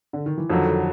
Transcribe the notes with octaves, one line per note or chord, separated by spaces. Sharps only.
D3
D#3
E3
F2 D3 D#3 F3 F#3